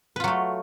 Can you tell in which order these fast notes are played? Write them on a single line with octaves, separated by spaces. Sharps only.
B4 F4 F#3 A3